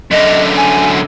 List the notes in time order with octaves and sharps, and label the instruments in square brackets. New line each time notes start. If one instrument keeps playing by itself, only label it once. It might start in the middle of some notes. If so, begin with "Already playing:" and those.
[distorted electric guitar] F#2 D3 [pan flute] D#5
[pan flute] G#5